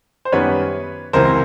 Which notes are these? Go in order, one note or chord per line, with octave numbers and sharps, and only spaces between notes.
C5
F#2 D#3 G3 B3 B4 C#5
C#2 C3 E3 A#4 C5